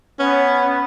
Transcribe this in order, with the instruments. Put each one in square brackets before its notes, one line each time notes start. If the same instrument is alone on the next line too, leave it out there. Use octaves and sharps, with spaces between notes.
[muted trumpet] B3 [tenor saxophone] C#4